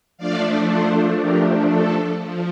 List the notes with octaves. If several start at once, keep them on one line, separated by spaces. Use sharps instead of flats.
F3 A3 D4 D5 F5
A4 C5
G4 A#4
A4
F3